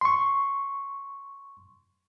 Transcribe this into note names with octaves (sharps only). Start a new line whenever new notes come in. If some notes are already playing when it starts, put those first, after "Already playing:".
C6 C#6